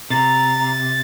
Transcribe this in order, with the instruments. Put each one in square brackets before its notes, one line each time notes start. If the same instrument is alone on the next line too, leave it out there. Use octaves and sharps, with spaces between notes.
[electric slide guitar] C3 [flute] A#5 [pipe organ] A6